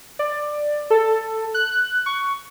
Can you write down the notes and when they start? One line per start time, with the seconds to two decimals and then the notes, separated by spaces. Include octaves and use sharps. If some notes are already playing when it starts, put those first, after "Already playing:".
0.19 D5
0.90 A4
1.54 F#6
2.06 C#6